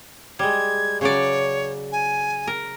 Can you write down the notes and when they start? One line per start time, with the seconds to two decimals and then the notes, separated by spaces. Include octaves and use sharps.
0.39 G3 G#3 G#6
1.01 C#3 F#3 C#5 D5
1.92 G#5
2.47 A#4